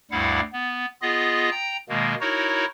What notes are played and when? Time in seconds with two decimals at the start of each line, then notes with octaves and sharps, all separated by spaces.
0.11 D2 G2 G3 E4 F5 F#5
0.53 B3
1.02 B3 F4 G#4 D#5
1.51 G5 A#5
1.89 B2 D#3 G#3 A#3
2.21 D#4 E4 F#4 A#4 C#5